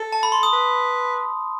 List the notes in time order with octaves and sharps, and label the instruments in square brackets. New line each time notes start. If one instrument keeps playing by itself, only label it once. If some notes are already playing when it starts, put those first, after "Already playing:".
Already playing: [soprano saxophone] A4
[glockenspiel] A5
B5
C6
D#6
[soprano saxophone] B4